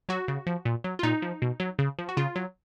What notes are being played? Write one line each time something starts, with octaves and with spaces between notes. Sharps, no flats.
F#3 F#4
C#3
F3
A#2
F#3
F4
A#2 D#4
F3
B2
F#3
C#3
F3
F#4
C#3 F4
F#3